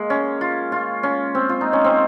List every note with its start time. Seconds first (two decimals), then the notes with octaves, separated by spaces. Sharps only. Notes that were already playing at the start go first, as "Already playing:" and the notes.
Already playing: G#3 A#3
0.10 C#4
0.41 F4
0.72 F4
1.03 C#4
1.35 C4
1.49 F4
1.61 D#4
1.73 C#4
1.84 C4